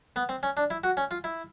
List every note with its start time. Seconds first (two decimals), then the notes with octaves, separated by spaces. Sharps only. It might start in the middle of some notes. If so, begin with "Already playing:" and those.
0.16 B3
0.29 C4
0.43 C#4
0.57 D4
0.70 E4
0.84 F#4
0.97 C#4
1.11 F4
1.24 E4